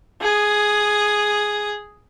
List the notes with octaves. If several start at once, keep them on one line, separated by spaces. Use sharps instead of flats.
G#4 D#6